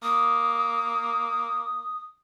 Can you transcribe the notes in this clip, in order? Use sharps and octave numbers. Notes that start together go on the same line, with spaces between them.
A#3 D#6